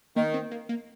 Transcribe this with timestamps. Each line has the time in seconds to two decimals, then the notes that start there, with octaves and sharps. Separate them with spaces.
0.16 D#3 A#3
0.34 C4
0.51 A#3
0.69 A#3